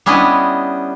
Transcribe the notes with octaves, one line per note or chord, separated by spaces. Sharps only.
G3 B3 C#4 D4 E4 D#5